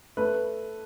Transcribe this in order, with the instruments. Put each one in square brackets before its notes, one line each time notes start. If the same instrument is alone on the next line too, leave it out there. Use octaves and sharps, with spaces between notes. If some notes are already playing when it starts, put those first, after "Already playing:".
[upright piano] A3 B4